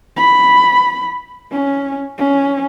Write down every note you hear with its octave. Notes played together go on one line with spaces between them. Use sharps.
B5
C#4
C#4